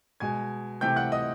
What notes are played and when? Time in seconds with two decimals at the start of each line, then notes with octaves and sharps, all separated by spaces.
0.20 B2 G#3 G#5 G#6
0.81 C3 E3 A3 G5 G6
0.96 F#5 F#6
1.12 D#5 D#6